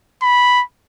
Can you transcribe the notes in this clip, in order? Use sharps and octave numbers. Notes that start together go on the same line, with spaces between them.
B5